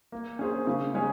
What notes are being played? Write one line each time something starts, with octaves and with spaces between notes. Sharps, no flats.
A#3
C#4 G#4 C5
C#3
G#3 C#4 G#4